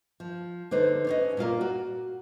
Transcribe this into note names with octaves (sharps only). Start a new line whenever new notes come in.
F3
D3 D#4 B4 C5
C#4 B4 D#5
A#2 A#3 F4 A#4
F#4